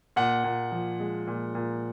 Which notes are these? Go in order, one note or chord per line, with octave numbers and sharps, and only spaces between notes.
A#2 F#5
A#2
F3
G#3
A#2
A#2